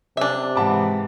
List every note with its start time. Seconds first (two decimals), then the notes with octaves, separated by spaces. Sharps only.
0.17 C3 D4 E5
0.56 G#2 E3 F#5 A5 D6